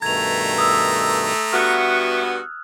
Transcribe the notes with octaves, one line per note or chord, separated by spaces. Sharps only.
G2 B2 D#3 A3 A#5 G#6 F7
D#6 E6
G2 B3 F#4 E5 C#6 F6 F#6